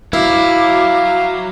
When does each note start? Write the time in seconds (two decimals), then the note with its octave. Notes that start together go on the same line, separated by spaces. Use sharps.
0.13 F#3 E4 F5 D6